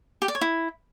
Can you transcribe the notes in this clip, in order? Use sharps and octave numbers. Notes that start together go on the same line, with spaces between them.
G4
D5
C#5
E4